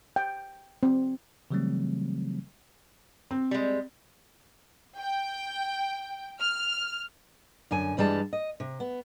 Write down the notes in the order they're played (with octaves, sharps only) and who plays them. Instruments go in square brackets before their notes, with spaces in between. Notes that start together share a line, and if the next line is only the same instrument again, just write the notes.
[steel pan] G5
C4
[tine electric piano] C#3 E3 F#3 G3 A3 C4
[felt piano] C4
[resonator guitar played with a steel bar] G3 G#3
[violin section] G5
F6
[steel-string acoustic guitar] F#2 D3 G#5
G2 E3 G3 G#3 A5
D#5
C3
B3